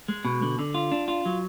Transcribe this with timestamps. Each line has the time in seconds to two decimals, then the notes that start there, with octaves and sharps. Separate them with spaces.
0.08 G#3
0.25 B2
0.42 D3
0.59 D3
0.74 F4
0.92 D4
1.08 F4
1.25 F#3